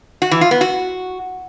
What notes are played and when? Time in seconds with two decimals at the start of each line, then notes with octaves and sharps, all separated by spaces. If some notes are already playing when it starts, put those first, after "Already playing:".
0.22 F#4
0.31 E3
0.41 F4
0.51 B3
0.61 F#4